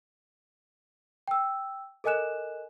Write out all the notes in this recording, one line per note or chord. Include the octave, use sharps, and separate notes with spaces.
G5 E6
A4 A#4 D#5 G#5 F#6 E7